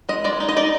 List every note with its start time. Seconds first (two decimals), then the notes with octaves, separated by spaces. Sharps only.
0.09 G#3 D#5
0.24 G#3 D5
0.40 D#4
0.49 D#5
0.56 D#4 D5